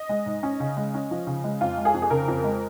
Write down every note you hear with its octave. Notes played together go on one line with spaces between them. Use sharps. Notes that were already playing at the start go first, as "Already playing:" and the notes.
Already playing: D#5
G#3
G#2
C#4
C#3
G#3
C#4
F3
C#3
G#3
F2 F4
G#3
G#4
F2
G#4
C#3 A#4
F2
G#3